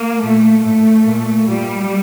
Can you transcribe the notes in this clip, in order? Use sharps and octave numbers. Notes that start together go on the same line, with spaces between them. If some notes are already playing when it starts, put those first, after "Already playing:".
Already playing: A#3
A#2 A3
A2 A3
A#2
A#2 G3